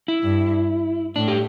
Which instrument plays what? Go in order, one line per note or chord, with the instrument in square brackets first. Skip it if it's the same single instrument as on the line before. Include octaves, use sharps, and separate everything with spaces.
[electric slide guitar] E4
[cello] G2
[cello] A2 [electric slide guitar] D4
[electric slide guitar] G4